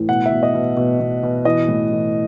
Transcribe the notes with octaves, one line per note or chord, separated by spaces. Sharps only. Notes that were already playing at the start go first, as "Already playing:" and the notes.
Already playing: A2 E3
B2 F#5
E5
B2
D#5
B2
B2
B2
B2
E3 D#5
A2
E3